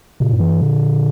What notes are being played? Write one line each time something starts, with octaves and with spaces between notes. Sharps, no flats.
A#2 C#3
G2
F#2 E3
G2
A#2 D3